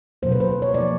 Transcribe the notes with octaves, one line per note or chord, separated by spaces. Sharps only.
B2 F#3 A#3 C#4 C5
B4
C5
C#5
F3 A#3 D#4 D5